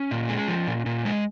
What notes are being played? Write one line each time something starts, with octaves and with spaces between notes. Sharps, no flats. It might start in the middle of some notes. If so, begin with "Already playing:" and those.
Already playing: C#4
A#2
G#3
F3
A#2
A#2
G#3